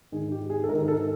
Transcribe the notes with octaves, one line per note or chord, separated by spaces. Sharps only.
G#2 D#3 G#4
G4
G#4
A4
G#2 D#3 A#4
A4